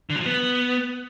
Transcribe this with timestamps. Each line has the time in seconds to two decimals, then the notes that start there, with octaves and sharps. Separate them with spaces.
0.10 D3
0.15 F#3
0.20 F3
0.26 B3